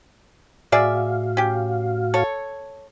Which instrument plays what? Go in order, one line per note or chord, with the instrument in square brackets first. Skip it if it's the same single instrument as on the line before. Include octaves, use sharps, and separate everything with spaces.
[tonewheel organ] A2 F#4 F5 [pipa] G#4 D5 E5
[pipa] C#4 G4
A4 C#5